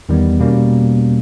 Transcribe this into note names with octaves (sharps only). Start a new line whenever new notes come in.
E2 D#3 G3 B3
B2 G3 A#3 C#4